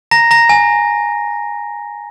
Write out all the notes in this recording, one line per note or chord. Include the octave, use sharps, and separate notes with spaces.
A#5 A#6
A#5 A#6
G#5